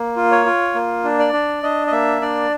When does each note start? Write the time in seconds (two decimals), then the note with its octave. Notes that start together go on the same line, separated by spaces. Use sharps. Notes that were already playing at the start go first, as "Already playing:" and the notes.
Already playing: A#3
0.16 F4
0.31 C#5
0.45 F4
0.75 A#3
1.04 D4
1.19 D5
1.33 D4
1.63 D4 D#5
1.87 D#5
1.92 A#3 E5
2.22 D4 D5